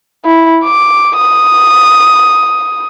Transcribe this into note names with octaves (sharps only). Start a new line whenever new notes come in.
E4
D6
D#6